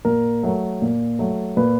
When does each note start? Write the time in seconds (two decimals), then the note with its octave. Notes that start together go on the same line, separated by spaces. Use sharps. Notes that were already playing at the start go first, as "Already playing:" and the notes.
0.05 A#2 A#4
0.43 F#3 A3
0.82 A#2
1.19 F#3 A3
1.57 A#2 B4